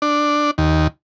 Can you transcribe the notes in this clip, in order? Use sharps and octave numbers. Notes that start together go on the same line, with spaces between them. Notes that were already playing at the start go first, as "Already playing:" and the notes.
D4
D#2